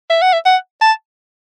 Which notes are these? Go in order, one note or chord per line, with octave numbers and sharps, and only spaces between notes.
E5
F#5
E5
F#5
A5